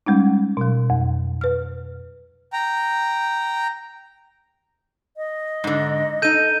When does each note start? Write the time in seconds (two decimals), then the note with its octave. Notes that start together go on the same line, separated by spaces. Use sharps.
0.06 G3 G#3 C#4 D#4
0.57 B2 F#3
0.90 F2
1.41 B4 F6
2.53 G5 A#5
5.17 D#5
5.64 G#2 D3
6.22 D#4 A4 G6 D#7